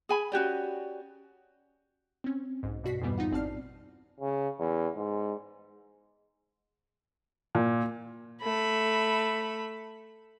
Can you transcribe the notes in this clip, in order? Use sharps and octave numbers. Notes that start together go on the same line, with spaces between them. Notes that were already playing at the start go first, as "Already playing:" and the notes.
G#4 G#5 B5
C#4 F#4 G4 D5
C4 C#4
B1 G#2
G2 B2 F#4 B6 C7
F2 G#2 B2 E3 G3 B3
D#4 F4 F#5
A1 C4 D5 A5 F6 C7
C#3
E2
G#2
A#2
A3 B5